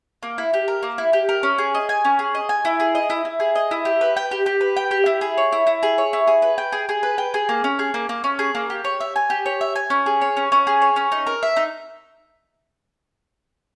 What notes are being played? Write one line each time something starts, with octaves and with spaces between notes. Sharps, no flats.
A#3
E4
G4
A#4
A#3
E4
G4
A#4
C#4
G#4
D#5
G#5
C#4
G#4
D#5
G#5
E4
G#4
D#5
E4
E4
G#4
D#5
E4
G4
B4
G5
G4
G4
B4
G5
G4
E4
G#4
C#5
E4
E4
G#4
C#5
E4
G#4
B4
G5
G#4
G#4
B4
G5
G#4
A#3
C#4
G#4
A#3
A#3
C#4
G#4
A#3
G4
C#5
E5
G#5
G4
C#5
E5
G#5
C#4
G#4
C#5
C#4
C#4
G#4
C#5
C#4
D#4
A#4
E5
D#4